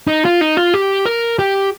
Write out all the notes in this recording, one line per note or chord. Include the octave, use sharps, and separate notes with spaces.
D#4
F4
D#4
F4
G4
A#4
G4